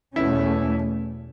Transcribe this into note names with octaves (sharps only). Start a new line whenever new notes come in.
E2 B2 A3 C#4 E4